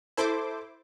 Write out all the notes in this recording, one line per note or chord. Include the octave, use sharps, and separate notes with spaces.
E4 A4 C5 D6